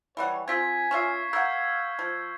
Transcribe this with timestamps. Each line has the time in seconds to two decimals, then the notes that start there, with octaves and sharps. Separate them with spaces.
0.17 E3 G3 C#5 F#5
0.48 C4 F4 G#4 G#5 G#6 B6
0.91 C#4 F4 E5 C#6 F6 C7
1.33 A#4 F5 F#5 E6 G6 G#6
1.99 F3